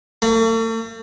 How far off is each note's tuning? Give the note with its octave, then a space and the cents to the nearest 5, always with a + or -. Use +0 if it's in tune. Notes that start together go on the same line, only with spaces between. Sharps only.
A3 +45